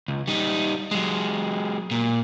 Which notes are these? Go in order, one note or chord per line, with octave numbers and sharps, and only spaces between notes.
C#2
G3 D#4
F#3 G#3
A#2